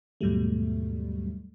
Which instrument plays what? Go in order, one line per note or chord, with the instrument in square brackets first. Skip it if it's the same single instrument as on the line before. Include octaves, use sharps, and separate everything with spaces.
[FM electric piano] D#2 G#2 B2 F#3 G3 A3